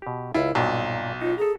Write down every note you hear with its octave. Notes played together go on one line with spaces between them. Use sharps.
B2 G4
C#2 E4 F4
B1 G2 A#2 F#3
D#4 F4 C#5
G#4 A4 A#5